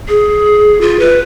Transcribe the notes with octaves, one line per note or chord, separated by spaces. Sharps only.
G#4
F4
B4